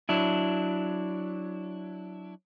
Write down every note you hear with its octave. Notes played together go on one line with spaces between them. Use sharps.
F#3 D4 E4